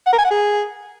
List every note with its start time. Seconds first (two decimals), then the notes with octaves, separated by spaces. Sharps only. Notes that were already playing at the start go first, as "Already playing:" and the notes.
0.07 F#5
0.13 A#4
0.19 G#5
0.25 F#5
0.31 G#4